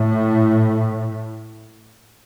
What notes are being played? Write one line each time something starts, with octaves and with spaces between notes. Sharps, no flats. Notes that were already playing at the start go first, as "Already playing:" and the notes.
Already playing: A2